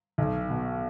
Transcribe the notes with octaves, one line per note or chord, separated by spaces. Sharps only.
B1
B2